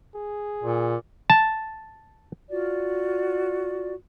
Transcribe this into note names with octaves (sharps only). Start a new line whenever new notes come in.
G#4
A#2
A5
F4 F#4 D5